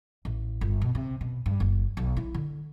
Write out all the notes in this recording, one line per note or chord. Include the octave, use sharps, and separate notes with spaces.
A1
G1
B2
C3
B2
G2
F#1
B1
E4
D3